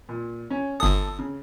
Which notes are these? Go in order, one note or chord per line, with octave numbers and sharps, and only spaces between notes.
A#2
C#4
G1 A4 A5 D#6
C#3